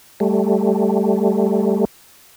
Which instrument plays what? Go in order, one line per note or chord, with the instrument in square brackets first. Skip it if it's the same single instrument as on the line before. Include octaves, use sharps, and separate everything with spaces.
[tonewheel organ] G3 A3